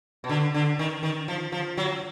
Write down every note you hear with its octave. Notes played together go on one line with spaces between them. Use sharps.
B2
D3
D3
D#3
D#3
F3
F3
F#3